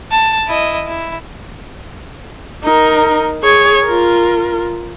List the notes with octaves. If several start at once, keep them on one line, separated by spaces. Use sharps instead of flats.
A5
E4 D#5
E4
D#4 A#4
G#4 C#5
F4 A#4